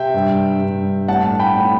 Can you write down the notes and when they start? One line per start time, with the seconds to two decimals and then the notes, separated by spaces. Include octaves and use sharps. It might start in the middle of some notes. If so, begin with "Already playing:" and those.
Already playing: C3 E5 G5
0.14 G2
0.61 G2
1.08 A2 F#5 A5
1.40 G5 B5
1.55 A2